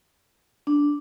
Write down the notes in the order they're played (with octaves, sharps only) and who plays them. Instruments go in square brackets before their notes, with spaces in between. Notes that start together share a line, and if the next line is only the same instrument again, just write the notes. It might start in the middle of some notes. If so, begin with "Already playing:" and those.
[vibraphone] D4